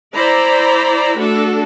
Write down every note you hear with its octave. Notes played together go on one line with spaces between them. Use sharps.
E4 C5 D5 A#5 B5
A3 D4 F#4 A4